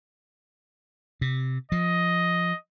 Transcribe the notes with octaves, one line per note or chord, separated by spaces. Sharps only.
C3
F3 D#5